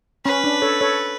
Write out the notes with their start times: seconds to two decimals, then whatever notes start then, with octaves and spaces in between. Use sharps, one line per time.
0.25 C#4 B4
0.44 D4
0.62 A4 C#5
0.81 A4 C#5